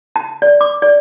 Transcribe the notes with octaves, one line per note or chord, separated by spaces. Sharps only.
A5
D5
D6
D5